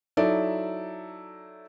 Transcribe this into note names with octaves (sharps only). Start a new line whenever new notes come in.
F#3 D#4 E4 A4 D5